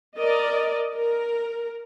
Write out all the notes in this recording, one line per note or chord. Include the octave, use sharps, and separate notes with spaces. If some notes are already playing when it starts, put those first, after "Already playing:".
A#4 D5 D#5
A#4